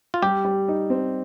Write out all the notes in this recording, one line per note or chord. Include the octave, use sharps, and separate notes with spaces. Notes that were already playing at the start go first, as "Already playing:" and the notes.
F4
G3 G4
G3
D#4
C4